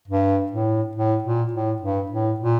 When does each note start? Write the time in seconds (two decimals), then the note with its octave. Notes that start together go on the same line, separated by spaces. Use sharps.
0.08 G2
0.51 A2
0.95 A2
1.24 A#2
1.53 A2
1.82 G2
2.11 A2
2.40 A#2